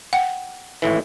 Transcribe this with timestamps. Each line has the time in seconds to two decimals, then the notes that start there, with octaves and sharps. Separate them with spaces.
0.13 F#5 G5
0.82 G#1 A2 E3